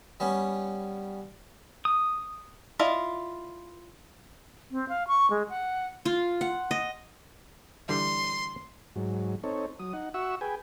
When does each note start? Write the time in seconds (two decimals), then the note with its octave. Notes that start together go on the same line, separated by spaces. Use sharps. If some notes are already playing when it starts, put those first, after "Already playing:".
0.20 G3 B3 C#4
1.85 D#6
2.79 E4 F4 D5 D#5
4.71 C4
4.89 F5
5.08 C#6
5.30 G#3
5.49 F#5
6.05 F4
6.41 F#5
6.71 D#5
7.89 D3 E3 G3 C6
8.96 G#2 F#3
9.44 C4 D#4 A4 C#5
9.79 F#3 D#6
9.93 D#4 F#5
10.14 F#4 E5 F#5 C#6 E6
10.41 G#4 B4 G5 G#5